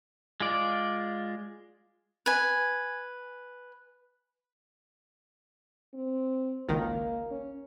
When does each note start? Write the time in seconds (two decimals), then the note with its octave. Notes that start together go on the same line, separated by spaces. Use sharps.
0.40 G#3 F4 D5
2.26 B4 G#5
5.94 C4
6.69 G#1 C#2 D#3 A#3
7.31 C#4